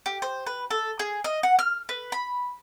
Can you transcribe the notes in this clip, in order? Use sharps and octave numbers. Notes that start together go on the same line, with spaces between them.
G4
C5
B4
A4
G#4
D#5
F#5
F6
B4
B5